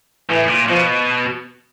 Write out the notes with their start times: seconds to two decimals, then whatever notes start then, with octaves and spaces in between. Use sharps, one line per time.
0.30 A2 E3
0.49 A#2
0.68 B2 F3